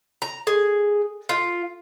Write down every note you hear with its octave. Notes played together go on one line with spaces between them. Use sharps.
A#5
G#4
F4